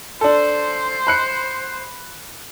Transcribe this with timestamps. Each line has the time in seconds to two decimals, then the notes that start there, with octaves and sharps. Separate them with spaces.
0.21 D4 A4 C5
1.07 B5 F#6 C#7